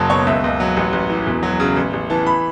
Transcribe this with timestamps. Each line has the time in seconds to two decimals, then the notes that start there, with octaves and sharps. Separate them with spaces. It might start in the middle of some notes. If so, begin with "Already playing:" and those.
Already playing: F#1 F#3 A5
0.10 B2 C#5
0.27 C#2 E5
0.44 C#2
0.60 F#3
0.77 A1
0.93 A1
1.10 E3
1.26 E1
1.43 F#3
1.60 C#3
1.77 A1
1.93 A1
2.10 E3 A5
2.26 B5